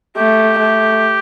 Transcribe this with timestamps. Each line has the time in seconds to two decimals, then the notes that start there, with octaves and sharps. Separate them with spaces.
0.17 A3 G4
0.59 A3